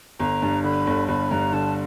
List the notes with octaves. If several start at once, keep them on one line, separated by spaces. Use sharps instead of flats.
G1 A#5
G2
D3 B5
G1
G1 B5
G2 A#5
D3 A5